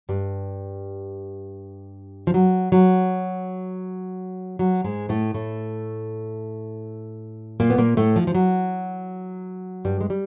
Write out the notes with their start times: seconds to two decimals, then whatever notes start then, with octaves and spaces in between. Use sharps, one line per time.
0.09 G2 G3
2.27 F3
2.34 F#3
2.72 F#3
4.59 F#3
4.84 G#2 G#3
5.09 A2 A3
5.34 A2 A3
7.60 A#2 A#3
7.70 B3
7.78 A#2 A#3
7.97 A2 A3
8.16 F3
8.27 F3
8.35 F#3
9.85 G2 G3
10.01 G#3
10.10 G3